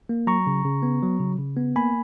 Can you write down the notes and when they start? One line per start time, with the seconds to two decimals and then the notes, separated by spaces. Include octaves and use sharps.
0.09 A#3
0.27 F#3 A#5 C#6
0.47 C#3
0.65 C#3
0.83 B3
1.02 F#3
1.20 C#3
1.39 C#3
1.57 B3
1.76 A#3 G#5 B5